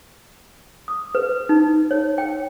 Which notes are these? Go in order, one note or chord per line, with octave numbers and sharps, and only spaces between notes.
D#6
B4
D#4
C#5
G5